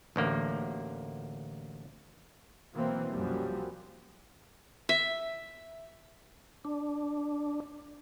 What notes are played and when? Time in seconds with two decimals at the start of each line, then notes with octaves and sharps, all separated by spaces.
0.16 A1 D2 A#3
2.73 B2 E3 F#3 A#3 C4
3.10 C2 F#2 F3 G3 A#3
4.89 E5
6.65 D4